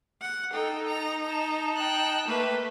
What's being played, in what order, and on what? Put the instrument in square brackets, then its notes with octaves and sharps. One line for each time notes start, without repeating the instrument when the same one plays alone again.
[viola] F#5
[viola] D#4 [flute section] A4 [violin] G5
[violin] A#5
[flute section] A5 [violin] A#5
[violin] G5 F#6
[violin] A3 [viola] A#3 B4